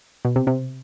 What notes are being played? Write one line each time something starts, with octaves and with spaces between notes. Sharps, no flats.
B2
C3
C3